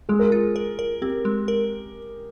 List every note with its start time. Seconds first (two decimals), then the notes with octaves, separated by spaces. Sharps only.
0.09 G#3 G#4
0.19 A#4
0.30 F4 G#4
0.56 A#4
0.79 A#4
1.02 C4 G4
1.25 G#3
1.48 A#4